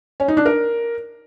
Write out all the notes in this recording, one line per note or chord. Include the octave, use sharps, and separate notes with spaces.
C#4
D#4
D4
A#4